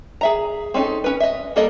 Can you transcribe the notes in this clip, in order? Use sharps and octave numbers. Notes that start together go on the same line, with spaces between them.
G#4 E5 A#5
C4 C#4 D#4 A4
C#4 B4
D#5 E5
G3 A#3 A4 A#4 D#5